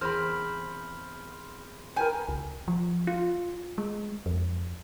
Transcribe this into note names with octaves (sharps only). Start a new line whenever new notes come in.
E2 C4 A#4 C5 B5 F6
A#4 B4 G5 G#5
C#2
F3
F4
G#3
F2